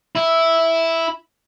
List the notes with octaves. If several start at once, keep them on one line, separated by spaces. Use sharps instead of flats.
E4